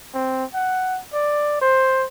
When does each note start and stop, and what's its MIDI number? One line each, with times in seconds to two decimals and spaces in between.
0.14 0.45 60
0.54 1.00 78
1.13 1.57 74
1.61 2.06 72